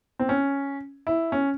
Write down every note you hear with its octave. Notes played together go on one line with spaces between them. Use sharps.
C4
C#4
E4
C#4